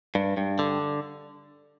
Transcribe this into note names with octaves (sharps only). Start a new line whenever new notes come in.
G2
G2
D3